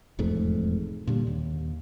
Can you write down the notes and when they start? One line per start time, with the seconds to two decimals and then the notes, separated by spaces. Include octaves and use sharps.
0.19 E1 F2 G#2 A3
1.07 A#2 D3 G3
1.27 D#2